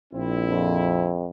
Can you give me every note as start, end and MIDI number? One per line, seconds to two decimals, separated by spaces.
0.13 1.14 34
0.13 1.14 60
0.13 1.14 64
0.49 1.29 41